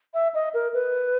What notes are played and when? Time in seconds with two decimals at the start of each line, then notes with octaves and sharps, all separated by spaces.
0.14 E5
0.34 D#5
0.54 A#4
0.74 B4